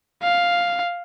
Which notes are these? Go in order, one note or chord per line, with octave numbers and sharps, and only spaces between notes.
F5